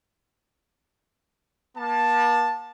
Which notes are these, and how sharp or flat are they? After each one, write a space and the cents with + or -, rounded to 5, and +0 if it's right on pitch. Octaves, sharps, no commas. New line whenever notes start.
A#3 +45 A5 +0